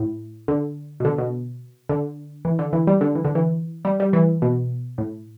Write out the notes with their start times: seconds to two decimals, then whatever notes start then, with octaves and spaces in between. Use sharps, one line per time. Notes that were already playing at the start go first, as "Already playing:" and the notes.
Already playing: A2
0.48 D3
1.00 B2
1.05 D3
1.18 B2
1.89 D3
2.45 E3
2.59 D3
2.73 E3
2.87 G3
3.01 D3
3.15 E3
3.25 D3
3.35 E3
3.85 G3
4.00 G3
4.13 E3
4.42 B2
4.98 A2